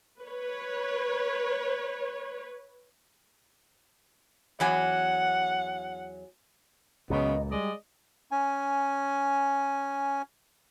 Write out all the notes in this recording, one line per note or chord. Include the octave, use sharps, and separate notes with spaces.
B4 C#5
E2 F#3 F#5 G#5
C#2 F#2 A#2 C#3 B3 D#5
G3 G#3 D5 D#5
C#4 G#5